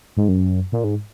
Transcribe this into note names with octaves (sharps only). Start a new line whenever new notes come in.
G#2
F#2
A#2
G#2